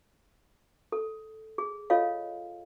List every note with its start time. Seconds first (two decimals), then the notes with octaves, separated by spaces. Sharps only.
0.92 A4
1.58 G#4
1.90 F4 A4 C#5 D#5 F5